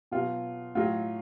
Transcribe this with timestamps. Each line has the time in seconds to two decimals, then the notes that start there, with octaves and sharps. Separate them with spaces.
0.12 B2 F#3 F4
0.75 A2 F#3 F4